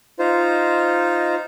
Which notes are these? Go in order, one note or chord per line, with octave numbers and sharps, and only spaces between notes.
D#4 F4 C5